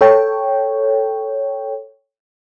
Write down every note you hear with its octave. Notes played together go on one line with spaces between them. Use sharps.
A4 C#5 G5